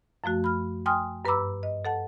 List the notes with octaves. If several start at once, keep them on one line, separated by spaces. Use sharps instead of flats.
F#2 F3 A3 F#4
B5 F6
G5 G#5 C6 D#6 F6
G2 B4 A#5 B5 D6 E6
D#5
A4 F#5 A5